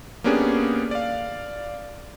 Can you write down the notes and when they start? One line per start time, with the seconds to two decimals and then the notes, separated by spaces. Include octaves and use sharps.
0.24 A#3 B3 C#4 D4 G4 G#4
0.91 D5 F5